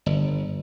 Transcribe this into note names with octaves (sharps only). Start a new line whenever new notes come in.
G1